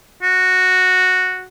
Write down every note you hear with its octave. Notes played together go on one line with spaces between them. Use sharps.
F#4